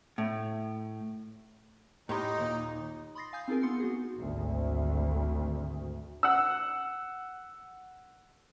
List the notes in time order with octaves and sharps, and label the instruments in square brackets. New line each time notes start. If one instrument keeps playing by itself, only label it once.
[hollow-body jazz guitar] A2
[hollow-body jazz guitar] A2 G4 C6 [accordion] D#4
[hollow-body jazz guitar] D#2 A#2
[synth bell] B5 C6 D#6 A6 A#6 C7
F5 G#5 D#6 G6
C4 D#4 F4 G#4 A#4 G#5
B3 C6 C#7
B3 F#4 G#4
[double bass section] G#1 D2
[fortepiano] F#5 E6